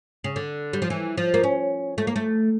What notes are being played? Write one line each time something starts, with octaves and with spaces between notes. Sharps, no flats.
C#3
D3
G3
F3
E3
F3
A#3
C#4
A3
A#3
A3